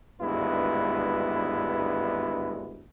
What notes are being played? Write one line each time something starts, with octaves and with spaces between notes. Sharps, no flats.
G#1 D2 G2 G#3 B3 E4